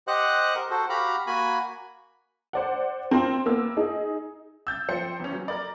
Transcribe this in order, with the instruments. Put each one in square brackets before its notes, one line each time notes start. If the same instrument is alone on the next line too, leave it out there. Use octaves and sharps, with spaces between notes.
[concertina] G4 C5 D#5 F#5 F#6
A#4
F#4 A4 C5
F#4 G4 F5 A#5 B5
A#3 F#4 G#5 B5
[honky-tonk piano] C5 D5 F#5
C4 F4 A#4 G5 C6
A#3 B3 E6
D#4 G#4
E6 G6 A6
F3 C5 G5 C#7
E2 C#4
F#3
A#4 D5